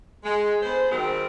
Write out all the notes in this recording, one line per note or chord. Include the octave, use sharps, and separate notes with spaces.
G#3
D3 B3 G#4 C5
D#3 G3 G#3 C4 F#4 A#4